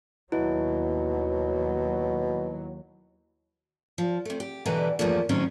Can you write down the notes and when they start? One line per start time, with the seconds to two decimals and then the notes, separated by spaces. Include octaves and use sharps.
0.32 D#2 B2 F#3 E4
3.98 F3
4.25 C3 A3
4.40 G4
4.65 B2 D3 E3 G3 B4 A#5
4.99 E2 G2 F3 A3 A#3
5.29 A2 D#3 F#3 C4 C#4 D#4